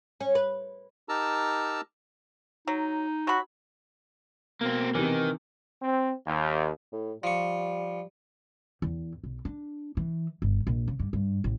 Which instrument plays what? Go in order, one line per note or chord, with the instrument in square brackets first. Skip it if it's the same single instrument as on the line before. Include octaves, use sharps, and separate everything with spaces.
[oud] C#4
B4
[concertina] D#4 G4 A#4 A5 A#5 E6
[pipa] F#3 [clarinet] D#4
[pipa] F#3 B5 [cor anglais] F#4
[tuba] B2 [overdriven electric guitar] A#3 C4
[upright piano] C3 E3 [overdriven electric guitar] D#3
[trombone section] C4
D#2
[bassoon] A2
[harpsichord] F3 C#6 [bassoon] G3
[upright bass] E2
B1
D4
E3
G1
A#1
C#3
G2
G2
A1